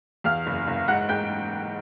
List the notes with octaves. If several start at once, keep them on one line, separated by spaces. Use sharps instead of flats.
E2 F5 F6
F#1
F#1
G#2 F#5 F#6
G#2 G5 G6